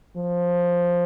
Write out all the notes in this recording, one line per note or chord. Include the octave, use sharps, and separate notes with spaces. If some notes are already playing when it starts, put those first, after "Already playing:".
F3